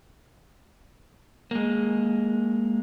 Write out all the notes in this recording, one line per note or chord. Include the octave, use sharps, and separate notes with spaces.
G#3 A#3